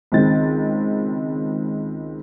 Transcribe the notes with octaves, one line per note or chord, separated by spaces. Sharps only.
C#2 D#3 C4 A6